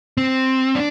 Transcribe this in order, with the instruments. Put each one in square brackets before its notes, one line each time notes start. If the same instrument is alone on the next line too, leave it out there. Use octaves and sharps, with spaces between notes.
[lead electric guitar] C4
D4